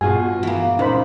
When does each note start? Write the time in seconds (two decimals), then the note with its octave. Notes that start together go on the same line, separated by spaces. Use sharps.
0.01 G2 B2 F4 F#4 G#4 G#5
0.43 E3 A#3
0.79 C#2 A#2 D#4 C5 B5